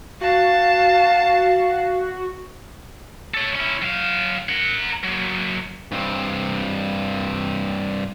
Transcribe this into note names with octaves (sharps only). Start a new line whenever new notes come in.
F#4 F5 A5
A4 C#5
C#4 E4
F#3 F5
A#4 F#5
F#3 A#3
G2 C4